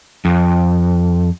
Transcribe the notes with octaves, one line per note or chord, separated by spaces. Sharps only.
F2